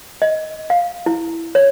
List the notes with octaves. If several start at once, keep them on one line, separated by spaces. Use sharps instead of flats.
D#5
F5
E4
C#5